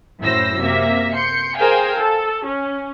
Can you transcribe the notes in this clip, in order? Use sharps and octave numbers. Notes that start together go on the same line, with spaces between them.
F#2 A2 E4 C5 E6 A#6
C3 A#3 E5 A#6
C6 G6 C#7
G#4 A#4 C5 F5 G5 G#5
A4
C#4